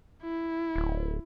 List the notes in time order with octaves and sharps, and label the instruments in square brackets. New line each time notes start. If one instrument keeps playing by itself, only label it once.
[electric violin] E4
[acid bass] D1